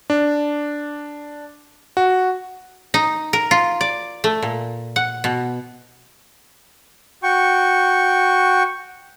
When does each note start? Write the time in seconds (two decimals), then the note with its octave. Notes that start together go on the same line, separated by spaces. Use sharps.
0.10 D4
1.97 F#4
2.94 D#4
3.33 A#4
3.51 F4
3.81 D5
4.24 A3
4.42 A#2
4.96 F#5
5.24 B2
7.23 F#4 G5 C#6